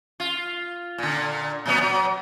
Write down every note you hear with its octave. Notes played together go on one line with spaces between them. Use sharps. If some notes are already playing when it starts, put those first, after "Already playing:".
F4
A#2 D3
A#2 F#3 B3
F#3